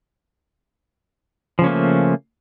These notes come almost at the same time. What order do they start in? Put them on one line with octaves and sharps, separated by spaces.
F3 C#3 C#4 A#3 A3